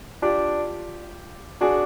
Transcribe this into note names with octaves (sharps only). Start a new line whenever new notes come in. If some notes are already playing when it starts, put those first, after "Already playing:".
D4 F4 G4
D4 F#4 G#4